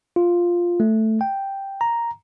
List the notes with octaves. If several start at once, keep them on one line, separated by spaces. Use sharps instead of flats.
F4
A3
G5
A#5